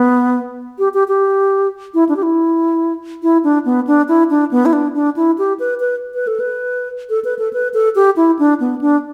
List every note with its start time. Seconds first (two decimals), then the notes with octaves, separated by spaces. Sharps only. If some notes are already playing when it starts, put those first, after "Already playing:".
Already playing: B3
0.79 G4
0.94 G4
1.08 G4
1.94 E4
2.09 D4
2.17 G4
2.23 E4
3.23 E4
3.44 D4
3.65 B3
3.87 D4
4.08 E4
4.30 D4
4.51 B3
4.66 E4
4.73 D4
4.95 D4
5.16 E4
5.38 G4
5.60 B4
5.80 B4
6.14 B4
6.27 A4
6.40 B4
7.10 A4
7.24 B4
7.39 A4
7.53 B4
7.74 A4
7.95 G4
8.16 E4
8.39 D4
8.60 B3
8.81 D4